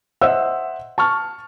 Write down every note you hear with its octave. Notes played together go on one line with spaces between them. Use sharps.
C5 D#5 E5 F#5 E6
A5 C#6 F6